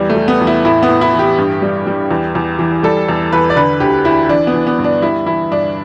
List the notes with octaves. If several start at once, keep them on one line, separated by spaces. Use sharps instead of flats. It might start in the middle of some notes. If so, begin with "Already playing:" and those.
Already playing: E2 G3
A3
G3
B3
E2
E4
A2 E4
B3
A2
E4
E3
G4
G2
G3
G3
E2
E2
E3
G3 A4
E2
E2 B4
D5
D3 B4
D2 G4
D2 E4
E3 D4
B3
E3
B3
G2
D4
G3 E4
E3 E4
G2 D4